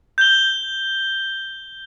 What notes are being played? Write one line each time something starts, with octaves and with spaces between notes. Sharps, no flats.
G6 G7